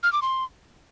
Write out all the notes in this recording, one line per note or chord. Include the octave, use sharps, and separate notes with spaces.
F6
D6
C6